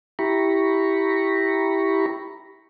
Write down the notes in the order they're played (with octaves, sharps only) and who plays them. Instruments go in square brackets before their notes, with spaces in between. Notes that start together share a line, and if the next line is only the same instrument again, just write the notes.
[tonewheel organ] E4 G4 A#5 B5 C#6